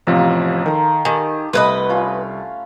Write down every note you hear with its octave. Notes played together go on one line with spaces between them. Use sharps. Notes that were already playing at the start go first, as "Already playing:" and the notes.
A1 C3 F3 A#3
D#3 A4 A#5 C6
D#3 G4 G#5 A5 D#6
C2 A3 B4 C5 D#5 F#5
C#4 F4 B5